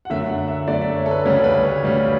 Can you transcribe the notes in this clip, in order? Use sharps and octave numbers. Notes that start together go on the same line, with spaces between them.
F#5
F#2 D3 A3 E5
F#5
E5
F#2 D3 A3 D5
E5
C#5
A4
B4
D2 C#3 G3 C#4 C#5
B4
B4
C#5
D2 C#3 G3 C#4